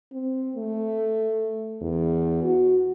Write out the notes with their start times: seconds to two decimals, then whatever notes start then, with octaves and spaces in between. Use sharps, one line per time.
0.12 C4
0.56 A3
1.81 E2
2.43 F#4